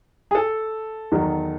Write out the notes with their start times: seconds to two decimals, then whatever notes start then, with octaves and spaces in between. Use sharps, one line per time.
0.31 G#4
0.35 A4
1.12 E2 D#3 F#3